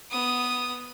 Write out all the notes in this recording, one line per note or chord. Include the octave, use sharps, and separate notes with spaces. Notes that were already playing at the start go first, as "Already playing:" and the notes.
B3 D#6